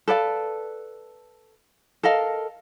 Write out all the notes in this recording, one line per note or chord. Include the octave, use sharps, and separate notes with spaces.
A4 B4 D5 F5
A4 A#4 D#5 F5